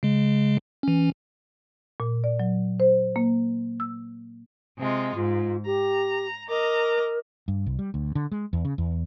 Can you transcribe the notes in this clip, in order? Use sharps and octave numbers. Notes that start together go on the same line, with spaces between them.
C#3 G#3
E3 C#4
A#2
D5
F#3
C5
A#3
E6
C3 G#3 F4
G#2 F4
G4 A#5
A#4 D#5 A#5 D6
G2
C2
G3
D2
D3
G#3
E2
C#3
E2